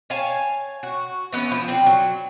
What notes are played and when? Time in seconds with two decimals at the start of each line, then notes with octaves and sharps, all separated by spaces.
0.10 C#5 F5 G#5 A5
0.83 F#4
1.33 E3 B3 C#4
1.51 F3
1.68 C4 D4
1.86 F#3